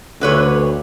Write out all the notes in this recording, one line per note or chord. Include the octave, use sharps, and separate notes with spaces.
D2 D3 B4 C#5